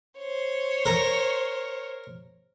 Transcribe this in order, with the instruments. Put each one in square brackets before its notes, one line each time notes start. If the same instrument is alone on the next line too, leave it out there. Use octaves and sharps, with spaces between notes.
[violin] C5 C#5
[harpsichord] A#4